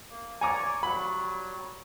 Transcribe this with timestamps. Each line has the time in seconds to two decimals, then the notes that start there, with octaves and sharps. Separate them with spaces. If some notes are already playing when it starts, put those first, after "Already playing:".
0.10 A#3
0.41 C#5 D5 G#5 A#5 C#6 D6
0.83 F#3 G3 B5